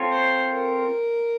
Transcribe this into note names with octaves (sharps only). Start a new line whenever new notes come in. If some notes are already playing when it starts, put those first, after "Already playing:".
Already playing: C4 F4 A4 C#5
C5
A#4